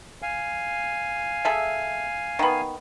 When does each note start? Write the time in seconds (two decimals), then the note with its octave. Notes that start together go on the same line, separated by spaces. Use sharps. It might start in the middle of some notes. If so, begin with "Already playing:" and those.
0.22 F5 G#5
1.45 G#4 A4 E5
2.39 D#3 B3